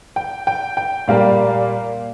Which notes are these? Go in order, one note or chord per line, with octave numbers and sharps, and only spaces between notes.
G5
G5
G5
A#2 G3 A#3 F5